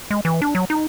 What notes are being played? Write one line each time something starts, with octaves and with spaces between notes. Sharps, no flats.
G#3
E3
D4
F#3
D#4